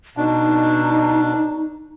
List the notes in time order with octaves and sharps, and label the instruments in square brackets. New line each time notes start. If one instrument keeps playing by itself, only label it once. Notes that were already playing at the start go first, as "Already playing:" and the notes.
[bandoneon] B2 D4 [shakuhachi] D#4